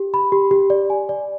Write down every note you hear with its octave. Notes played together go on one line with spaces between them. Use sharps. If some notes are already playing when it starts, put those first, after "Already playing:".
Already playing: G4
B5
G4
G4
D5
G#5
D5